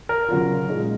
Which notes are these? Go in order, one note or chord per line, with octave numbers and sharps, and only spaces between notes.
A#4
C#3 F#3 C#4 F4
A#2 G#3 D#4